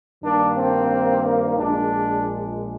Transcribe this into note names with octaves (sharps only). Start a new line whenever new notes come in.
G2 D#3 A#3 D4
C4
A#1 A#2 G#3 D4